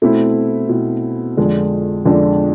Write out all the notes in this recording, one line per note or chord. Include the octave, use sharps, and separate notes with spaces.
B2 A3 C4 E4
B2 A3 C4 E4
F2 D3 G#3 D4
F2 D3 G#3 D4